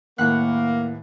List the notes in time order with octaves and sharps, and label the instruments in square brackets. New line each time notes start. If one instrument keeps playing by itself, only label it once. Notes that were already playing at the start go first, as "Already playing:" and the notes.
[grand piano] D#2 A2 [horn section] A#3 [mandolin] B4 F#5 F#6